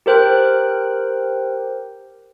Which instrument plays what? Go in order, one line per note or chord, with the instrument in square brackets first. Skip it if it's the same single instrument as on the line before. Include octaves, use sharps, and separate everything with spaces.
[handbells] G4 A#4 C5 G5 F#6